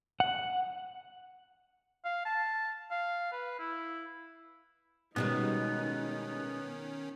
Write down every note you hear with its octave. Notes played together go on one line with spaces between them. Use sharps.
F#5
F5
A5
F5
B4
E4
B2 D#3 G3 G#3 B3 C#4 D#4